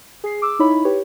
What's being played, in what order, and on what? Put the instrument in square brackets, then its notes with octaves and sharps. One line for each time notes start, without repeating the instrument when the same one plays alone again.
[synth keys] G#4 C7
D6 E6
D#4 E4 C#5 B5
G4 B4 C#5